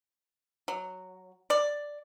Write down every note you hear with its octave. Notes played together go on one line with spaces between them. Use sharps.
F#3
D5